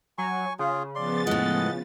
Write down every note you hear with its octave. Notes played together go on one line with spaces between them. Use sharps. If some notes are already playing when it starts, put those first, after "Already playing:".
F#3 G#5 C#6
C#3 F4 G#4
F3 B3 D5 C6 A6
A2 G#3 D#5 F#5